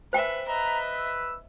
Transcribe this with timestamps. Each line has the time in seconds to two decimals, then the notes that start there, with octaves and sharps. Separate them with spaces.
0.13 B4 C5 E5 G5 G#5
0.48 B4 D#5 E5 A#5
0.97 E6